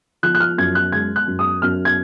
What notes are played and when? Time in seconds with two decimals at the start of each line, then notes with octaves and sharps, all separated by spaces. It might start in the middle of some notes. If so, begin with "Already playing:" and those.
0.23 F3 F#6
0.35 F#6
0.40 F6
0.58 F#2 G#6
0.75 F#6
0.92 G#3 G#6
1.16 F#6
1.27 F#2
1.39 D#6
1.62 F#2 F6
1.85 G#6